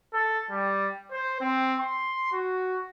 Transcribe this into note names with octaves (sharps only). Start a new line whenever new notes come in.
A4
G3
C5
C4
C6
F#4